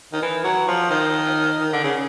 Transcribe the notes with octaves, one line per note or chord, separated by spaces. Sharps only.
D#3
E3
F#3
F3
D#3
D#3
D3
C#3